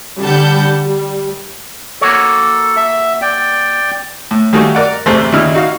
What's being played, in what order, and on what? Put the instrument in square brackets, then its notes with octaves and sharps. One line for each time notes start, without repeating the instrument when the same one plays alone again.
[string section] D3 G3 F#5 A5 B5 G6
G3
[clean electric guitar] A#3 F#4 C#5 [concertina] A4
[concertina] E5
D5 G5
[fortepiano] A2
D#3 G3 A3 A#3 F#4 G#5
A#4 D5 F#5
A1 E2 C3 A3 C5
D#2 A#2 C#3 D#4 E4 F6
D#4 F#4 F5